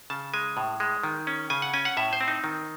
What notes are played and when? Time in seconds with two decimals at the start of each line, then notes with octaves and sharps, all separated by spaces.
0.10 C#3 A5
0.34 G#3 G#5
0.57 A2
0.80 G#3
1.04 D#3
1.27 C#4
1.50 C#3 G#5
1.62 F#5
1.74 C#4 G#5
1.85 F#5
1.97 A2 E5
2.13 C5
2.21 C4
2.28 D#4
2.44 D#3